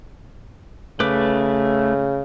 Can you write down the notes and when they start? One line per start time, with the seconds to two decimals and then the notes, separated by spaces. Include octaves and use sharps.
1.00 C#3 A3 B4 D6